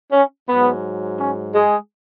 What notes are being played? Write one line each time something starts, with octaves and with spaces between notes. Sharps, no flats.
C#4
G#2 F#3 B3
C#4
G#3 G#4